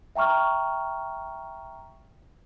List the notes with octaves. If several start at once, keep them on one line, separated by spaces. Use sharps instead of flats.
E5 G5 A#5 C#6 F6